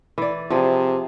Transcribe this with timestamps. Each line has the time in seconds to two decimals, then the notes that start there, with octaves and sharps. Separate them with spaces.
0.18 E3 D5
0.51 C3 F3 G#4